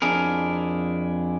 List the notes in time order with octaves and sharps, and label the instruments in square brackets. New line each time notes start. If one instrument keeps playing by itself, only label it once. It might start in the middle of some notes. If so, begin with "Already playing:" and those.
[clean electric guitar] F2 D4 E4 G#4 A#4